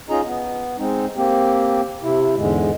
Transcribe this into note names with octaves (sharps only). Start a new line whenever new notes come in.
C#4 D#4 F4 G#4 D#5 A#5
B3
G#3 C4 D#4
A#3 C4 G4
C3 E4
E2 G#2 D3 G#3